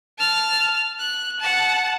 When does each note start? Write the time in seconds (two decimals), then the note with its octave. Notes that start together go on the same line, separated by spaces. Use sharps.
0.18 A5 F6
0.99 F#6
1.40 F#5 A5